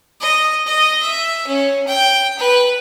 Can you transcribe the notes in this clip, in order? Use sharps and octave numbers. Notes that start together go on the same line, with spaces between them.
D#5
D#5
E5
C#4
G5
B4